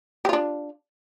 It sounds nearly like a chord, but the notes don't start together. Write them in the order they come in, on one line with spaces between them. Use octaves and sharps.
G4 F4 D4